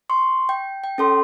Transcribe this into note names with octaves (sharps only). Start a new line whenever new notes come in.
C6 C#6
G5
G5
C#4 A4 C6